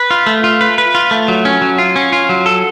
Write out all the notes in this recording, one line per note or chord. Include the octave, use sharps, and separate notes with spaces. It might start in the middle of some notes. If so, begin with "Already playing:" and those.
Already playing: B4
F4
A3
F4
B4
B4
F4
A3
F#3
C#4
F#3
F4
C#4
F4
F#3
A4